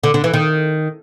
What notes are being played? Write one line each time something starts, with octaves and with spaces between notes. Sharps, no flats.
D3
D3
E3
D#3